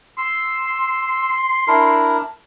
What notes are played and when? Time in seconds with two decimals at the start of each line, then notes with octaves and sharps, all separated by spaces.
0.18 C6 E6
1.68 D4 E4 A#4